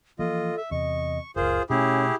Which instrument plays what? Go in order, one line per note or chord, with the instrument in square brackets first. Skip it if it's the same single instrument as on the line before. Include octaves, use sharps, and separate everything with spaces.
[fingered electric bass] E3 F3 A#3 [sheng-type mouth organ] F4 D#5 [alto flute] A4
[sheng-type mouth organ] E5
[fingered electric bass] E2 C3 [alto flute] D#5 [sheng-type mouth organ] C#6
[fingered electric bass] F#1 C#2 [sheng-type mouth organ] F4 G#4 C5 [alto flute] A#4
[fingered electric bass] B2 A3 [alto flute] C#4 [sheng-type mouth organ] E4 G4 G#4